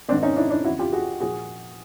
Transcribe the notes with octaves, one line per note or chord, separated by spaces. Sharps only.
G#2 D#3 C4 D4
C#4 D#4
D4 E4
D4 E4
F2 C#3 E3 E4 F#4
F4 G4
F#4 G#4
A#2 F3 F#4 G#4